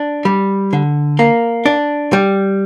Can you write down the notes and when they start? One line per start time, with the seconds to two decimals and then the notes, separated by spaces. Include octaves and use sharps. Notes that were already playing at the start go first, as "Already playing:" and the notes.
Already playing: D4
0.25 G3
0.73 D3
1.19 A#3
1.66 D4
2.13 G3